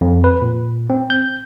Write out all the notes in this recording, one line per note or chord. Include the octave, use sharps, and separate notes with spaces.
F2
B4
A#2
C4
G6